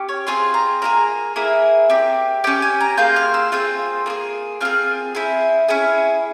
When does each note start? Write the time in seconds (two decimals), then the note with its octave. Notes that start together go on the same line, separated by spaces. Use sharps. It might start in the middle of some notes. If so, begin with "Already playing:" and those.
Already playing: C#4 G4
0.09 C#5
0.27 C4 F4 G#4 C6
0.54 A#5
0.82 A#3 E4 G#4 A#5
1.36 A#3 E4 G#4
1.90 C4 G4
2.44 C#4 G4 G5
2.62 G#5
2.81 A#5
2.97 A#3 F4 G#4 G6
3.16 F6
3.34 E6
3.52 C4 F4 G#4 G6
4.06 A#3 F4
4.10 G#4
4.60 C4 F4 G#4 F6
5.15 C4 E4 G#4
5.68 C#4 E4 G#4